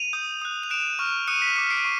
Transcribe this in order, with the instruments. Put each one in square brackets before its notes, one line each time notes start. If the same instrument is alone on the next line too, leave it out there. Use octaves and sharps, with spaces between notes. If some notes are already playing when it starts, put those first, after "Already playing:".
Already playing: [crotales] D#7 F7
D#6 G6
D#6 F#6
F7
D#6 F#6 D7 E7
C#6 F6
D#6 F#6 C#7 D#7
B6 C#7
D6 F6 B6 C#7
C7 D7
D#7
C#6